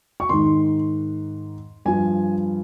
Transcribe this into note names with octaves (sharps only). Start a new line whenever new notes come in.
C#6
G#2 D#3 C6
G2 F3 G#5